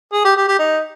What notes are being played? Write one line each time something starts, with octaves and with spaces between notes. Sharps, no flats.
G#4
G4
G4
G4
D#4